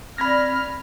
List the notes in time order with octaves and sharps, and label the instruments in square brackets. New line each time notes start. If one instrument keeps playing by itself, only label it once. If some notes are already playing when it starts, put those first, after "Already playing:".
[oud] G2 D4 [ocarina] C4 [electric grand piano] B5 G#6 A#6 [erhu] F6